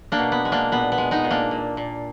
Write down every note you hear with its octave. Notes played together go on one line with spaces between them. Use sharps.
A#3 D4
B2
B3
G#3
A#3 D4
A#2 B3
B3
G#3
B3 D#4
A#2
A#3 D4
A#2
A#2